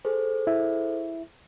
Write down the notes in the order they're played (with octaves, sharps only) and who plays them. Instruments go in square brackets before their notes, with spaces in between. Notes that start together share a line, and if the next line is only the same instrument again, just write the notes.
[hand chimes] G#4 A4 C5
[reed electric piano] E4 E5